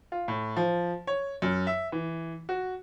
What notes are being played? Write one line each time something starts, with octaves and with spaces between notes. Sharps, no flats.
F4
A2
F3
C#5
F#2
E5
E3
F#4